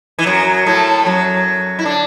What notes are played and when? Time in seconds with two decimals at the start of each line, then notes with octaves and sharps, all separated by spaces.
0.19 E3
0.26 F#2 F#3
0.66 A2 A3
1.05 F#2 F#3
1.79 E4
1.85 D3 D4